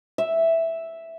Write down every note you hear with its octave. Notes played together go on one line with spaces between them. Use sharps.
E5